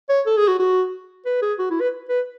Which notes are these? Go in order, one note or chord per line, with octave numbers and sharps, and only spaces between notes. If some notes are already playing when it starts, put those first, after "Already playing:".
C#5
A4
G#4
F#4
F#4
B4
G#4
F#4
E4
B4
B4